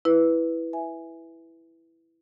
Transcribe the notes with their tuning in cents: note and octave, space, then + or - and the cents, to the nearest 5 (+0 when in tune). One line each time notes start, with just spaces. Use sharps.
E4 +0 B4 +0
E5 +0 G#5 +0